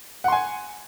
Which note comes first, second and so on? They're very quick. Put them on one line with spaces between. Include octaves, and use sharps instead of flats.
F#5 C6 G#5